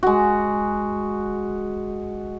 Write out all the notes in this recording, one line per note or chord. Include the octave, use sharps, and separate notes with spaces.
G#3 F#4